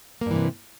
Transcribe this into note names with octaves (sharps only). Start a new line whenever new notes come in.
G2 C3 E3 A#3